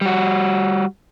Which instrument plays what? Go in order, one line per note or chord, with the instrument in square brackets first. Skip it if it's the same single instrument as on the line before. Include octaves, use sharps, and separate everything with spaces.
[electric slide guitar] G3 F#4